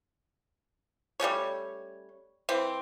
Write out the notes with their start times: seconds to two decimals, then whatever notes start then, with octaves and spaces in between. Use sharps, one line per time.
1.20 G3 A3 C#4 C#5
2.49 E3 C4